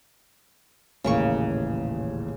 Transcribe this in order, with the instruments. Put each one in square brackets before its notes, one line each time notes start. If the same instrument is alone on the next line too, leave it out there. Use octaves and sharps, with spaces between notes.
[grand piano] D#1 A1 E3 [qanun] C#3 A#3 C#6